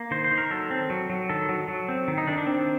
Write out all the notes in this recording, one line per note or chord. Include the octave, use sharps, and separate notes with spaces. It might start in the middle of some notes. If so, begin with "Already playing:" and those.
Already playing: A#3
D#3 C5
C5
D#3
A#4
F#3 A4
C4
F#3
F#3
D#3 A4
F#3
F#3
C4
D#3
D#4
D#3 D4
D4
C4